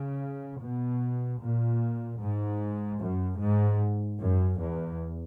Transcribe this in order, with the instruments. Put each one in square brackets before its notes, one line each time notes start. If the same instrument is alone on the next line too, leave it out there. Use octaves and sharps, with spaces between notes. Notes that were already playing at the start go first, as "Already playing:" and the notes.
Already playing: [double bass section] C#3
B2
A#2
G#2
F#2
G#2
F#2
E2